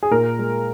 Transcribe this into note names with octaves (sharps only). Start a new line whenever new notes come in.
G#4
A#2 A#4
G#3